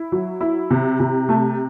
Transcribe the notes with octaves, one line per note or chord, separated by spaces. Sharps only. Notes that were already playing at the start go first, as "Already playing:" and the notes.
Already playing: E4
F#3
E4
C3
C3
A3